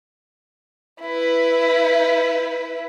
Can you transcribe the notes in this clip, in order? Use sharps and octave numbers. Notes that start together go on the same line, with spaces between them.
E4 B4